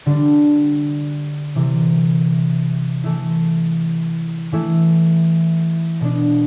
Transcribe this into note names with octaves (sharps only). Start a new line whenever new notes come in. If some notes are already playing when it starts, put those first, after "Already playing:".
D3 G3 D4
C3 E3 G3 C4
E3 A3 E4
E3 A3 E4
B2 B3 D4